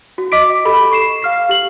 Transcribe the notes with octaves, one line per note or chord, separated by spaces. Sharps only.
F#4
D#5 D6 B6 D7
G4 A4 B5
C#6 C7 E7
F5 F6 C7
G4 F#7